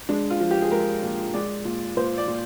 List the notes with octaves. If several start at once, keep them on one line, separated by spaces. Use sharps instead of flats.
G#3 D4
F4
F3
G4
G#4
G#3 A#4
A#2
G#3 D5
A#2
A#2 C5
D5
A#2